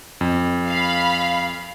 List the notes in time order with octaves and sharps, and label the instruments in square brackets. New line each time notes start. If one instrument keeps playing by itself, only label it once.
[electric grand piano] F2
[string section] F5 B5